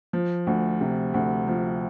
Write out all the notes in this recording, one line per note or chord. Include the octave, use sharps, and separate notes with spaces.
F3
D2
C3
D2
F3